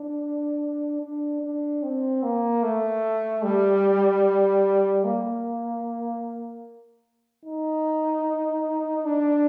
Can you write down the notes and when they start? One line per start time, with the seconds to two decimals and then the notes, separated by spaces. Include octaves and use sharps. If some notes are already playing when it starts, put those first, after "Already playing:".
Already playing: D4
1.02 D4
1.42 D4
1.83 C4
2.23 A#3
2.63 A3
3.43 G3
5.05 A#3
7.45 D#4
9.05 D4